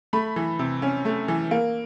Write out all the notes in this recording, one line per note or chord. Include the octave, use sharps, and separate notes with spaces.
A3 B5
E3
C3
C#4
A3
E3
A#3